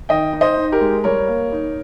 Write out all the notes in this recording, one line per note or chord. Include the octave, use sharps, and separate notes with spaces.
D#3 D#5 G5
D#4
C5 D#5
D#4
G4 A#4
G#3
G3 A#4 C#5
A#3
D#4